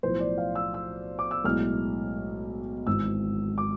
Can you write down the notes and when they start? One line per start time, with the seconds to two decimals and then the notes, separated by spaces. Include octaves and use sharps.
0.03 B1 A2 F3 C5
0.20 D5
0.38 F5
0.55 E6
0.74 E6
1.19 D6
1.31 E6
1.44 B1 A2 G#3 F6
2.87 G#1 G#2 E3 E6
3.58 D6